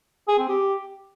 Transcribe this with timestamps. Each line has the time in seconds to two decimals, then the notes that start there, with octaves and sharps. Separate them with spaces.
0.28 G#4
0.38 C4
0.49 G4